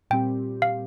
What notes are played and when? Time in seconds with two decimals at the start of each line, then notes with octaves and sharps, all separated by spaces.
0.10 A#2 G3 C4 G4 G5
0.62 F5